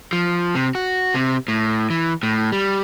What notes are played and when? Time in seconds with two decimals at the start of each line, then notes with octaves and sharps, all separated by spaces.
0.13 F3
0.55 C3
0.75 F#4
1.14 C3
1.48 A2
1.90 E3
2.23 A2
2.52 G3